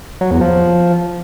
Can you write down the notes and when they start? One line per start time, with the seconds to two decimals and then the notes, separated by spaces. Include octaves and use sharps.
0.21 F#3
0.31 E2
0.41 F3